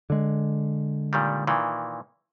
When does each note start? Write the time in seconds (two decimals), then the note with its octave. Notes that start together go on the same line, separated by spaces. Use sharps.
0.10 D3 G#3
1.13 A#2 D#3 G3
1.47 A#2 D#3 E3